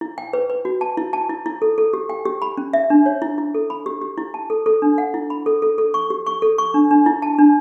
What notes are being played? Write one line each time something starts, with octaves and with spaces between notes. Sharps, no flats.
E4
G5
B4
B4
F#4
A5
E4
A5
E4
E4
A4
A4
G4
G5
G4
B5
C#4
E5
D4
C#5
E4
E4
A4
B5
G4
G4
E4
A5
A4
A4
D4
F#5
E4
B5
A4
A4
A4
C#6
G4
C#6
A4
C#6
D4
D4
E4
A5
D4